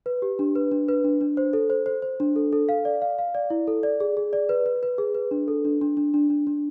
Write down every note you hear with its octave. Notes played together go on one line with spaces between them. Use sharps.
B4
G4
D4
B4
D4
B4
D4
D4
C5
A4
C5
C5
C5
D4
A4
A4
F5
D5
F5
F5
D5
E4
A4
D5
G#4
G#4
D5
B4
B4
B4
G#4
B4
D4
A4
D4
D4
D4
D4
D4
D4